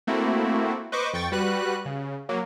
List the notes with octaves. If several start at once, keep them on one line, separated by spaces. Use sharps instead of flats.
A3 A#3 C4 E4 F#4
B4 C5 D#5 C#6 D6
F2 G5 C#6 A6
G3 F#4 B4 F#6
C#3
F#3 A#3